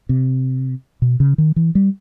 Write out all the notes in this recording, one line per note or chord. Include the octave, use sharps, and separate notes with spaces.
C3
B2
C#3
D#3
E3
G3